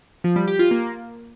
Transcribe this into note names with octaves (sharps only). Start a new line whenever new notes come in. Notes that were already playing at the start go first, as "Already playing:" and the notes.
F3
G3
G4
F4
A#3